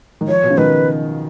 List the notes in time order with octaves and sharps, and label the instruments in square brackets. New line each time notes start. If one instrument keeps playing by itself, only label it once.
[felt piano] D#3
[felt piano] F3 [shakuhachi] C#5
[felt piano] B2
C#3
[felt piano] D#3 [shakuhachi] B4